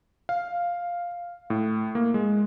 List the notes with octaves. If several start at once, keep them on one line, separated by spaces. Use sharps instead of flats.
F5
A2
A#3
G#3